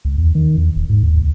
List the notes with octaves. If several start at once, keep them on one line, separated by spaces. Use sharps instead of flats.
C#2
E2
D#3
E2
D1
G#2
D#2
C#2